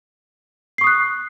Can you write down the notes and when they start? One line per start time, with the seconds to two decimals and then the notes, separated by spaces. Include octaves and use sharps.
0.78 C7
0.81 C#6
0.84 D#6
0.87 F#6